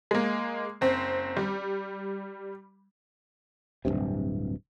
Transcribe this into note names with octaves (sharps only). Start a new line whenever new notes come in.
G#3 A#3
F#1 C4
G3
D1 G#1 G2 C3